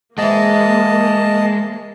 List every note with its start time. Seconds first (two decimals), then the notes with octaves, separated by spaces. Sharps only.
0.18 G#2 E3 G#3 A#3 D#5 A5